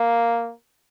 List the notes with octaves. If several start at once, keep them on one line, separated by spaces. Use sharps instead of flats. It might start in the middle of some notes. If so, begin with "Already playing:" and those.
Already playing: A#3